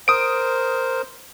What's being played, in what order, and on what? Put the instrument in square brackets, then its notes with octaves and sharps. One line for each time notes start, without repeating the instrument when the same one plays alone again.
[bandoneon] A#4 C5 [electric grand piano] D#6 D7